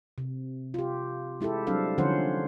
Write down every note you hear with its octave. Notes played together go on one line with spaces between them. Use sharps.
C3
F4 G4
G#3 E4 G4 A4
F#3 G3 C4 D4 A4 F5
D3 F3 C#4 D#4 C5 F#5